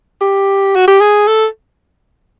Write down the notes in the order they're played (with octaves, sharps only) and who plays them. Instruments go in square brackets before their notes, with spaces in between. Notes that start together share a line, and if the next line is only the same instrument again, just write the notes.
[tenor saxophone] G4
F#4
G4
G#4
A4